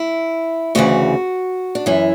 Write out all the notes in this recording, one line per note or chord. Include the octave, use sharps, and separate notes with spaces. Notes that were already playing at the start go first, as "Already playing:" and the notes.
Already playing: E4
D2 C#3 E3 F#4
D4
F#2 E3 E4